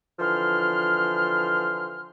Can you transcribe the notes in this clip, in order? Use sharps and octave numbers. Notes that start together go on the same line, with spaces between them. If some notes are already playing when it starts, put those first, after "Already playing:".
D3 E3 F3 C6 F6